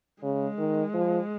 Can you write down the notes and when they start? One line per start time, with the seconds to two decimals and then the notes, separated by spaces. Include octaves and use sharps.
0.22 C#3 G#3
0.58 D#3
0.94 F3